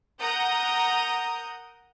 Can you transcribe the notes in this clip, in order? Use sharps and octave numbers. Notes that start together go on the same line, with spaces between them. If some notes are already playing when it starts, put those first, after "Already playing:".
A#4 F#5 A#5 D#6 G6